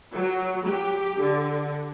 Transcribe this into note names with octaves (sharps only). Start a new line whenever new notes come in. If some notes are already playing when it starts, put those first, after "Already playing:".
F#3
G4
D3